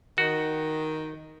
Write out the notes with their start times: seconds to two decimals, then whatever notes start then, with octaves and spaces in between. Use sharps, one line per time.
0.18 D#3 F#4